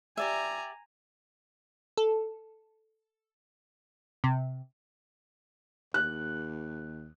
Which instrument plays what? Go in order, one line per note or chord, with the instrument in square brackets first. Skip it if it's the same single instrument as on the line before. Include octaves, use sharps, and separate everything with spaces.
[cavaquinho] G4 D5 E5 [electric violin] G#5 A#5
[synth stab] A4
C3
[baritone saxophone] D#2 [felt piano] F#6